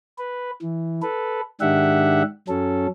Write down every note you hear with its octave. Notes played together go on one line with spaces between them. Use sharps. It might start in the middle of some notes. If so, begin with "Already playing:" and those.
B4
E3
A4 B4
G#2 D#3 D4 G4 E5 F#5
F#2 F#3 C#4 A4